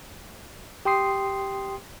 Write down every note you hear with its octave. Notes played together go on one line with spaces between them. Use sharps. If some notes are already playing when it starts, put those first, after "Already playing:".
G4 G5 C6 D#6 C7